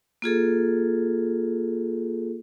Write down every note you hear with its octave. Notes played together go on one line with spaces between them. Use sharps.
A#3 F4 G#4 A4